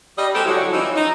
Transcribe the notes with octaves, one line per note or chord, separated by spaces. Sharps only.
G3 D#5
G#3 G4 A4 C5
D3 F#3 G3 E4 F#4
E3 F3 C4 C#4 D#4
D#4